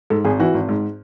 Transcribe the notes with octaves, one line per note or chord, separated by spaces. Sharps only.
G#2 A4
G#1 G#4
E3 F#4
G#1
G#2